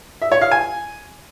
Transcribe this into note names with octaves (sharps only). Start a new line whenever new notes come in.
E5
C#5
F5
G#5